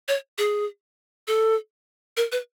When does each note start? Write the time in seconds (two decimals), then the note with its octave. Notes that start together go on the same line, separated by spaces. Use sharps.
0.08 C#5
0.38 G#4
1.27 A4
2.17 A#4
2.32 B4